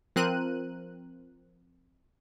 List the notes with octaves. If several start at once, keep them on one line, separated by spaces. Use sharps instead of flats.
F3 C4 A#4 F#6 D#7